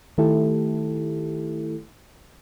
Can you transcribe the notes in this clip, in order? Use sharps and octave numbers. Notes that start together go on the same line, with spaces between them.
D#3 A3 E4 G4 A4